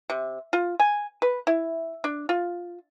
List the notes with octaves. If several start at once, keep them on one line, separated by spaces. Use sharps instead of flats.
C3
F4
G#5
B4
E4
D4
F4